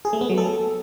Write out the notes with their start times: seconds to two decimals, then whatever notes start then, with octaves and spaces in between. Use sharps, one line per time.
0.05 G#4
0.13 A3
0.21 B3
0.29 F#3
0.38 A4